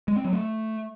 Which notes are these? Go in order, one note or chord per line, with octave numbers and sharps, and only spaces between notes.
G#3
C4
F#3
A3